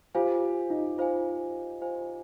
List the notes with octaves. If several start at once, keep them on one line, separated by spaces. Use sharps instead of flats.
F4 G4 C5 F5 G#5
D#4
F4 C5 F5 G#5
F4 C5 F5 G#5